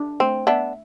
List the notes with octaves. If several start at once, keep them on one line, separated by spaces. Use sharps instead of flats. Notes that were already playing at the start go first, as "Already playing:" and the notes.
Already playing: D4
A3 C4
B3 D4 E5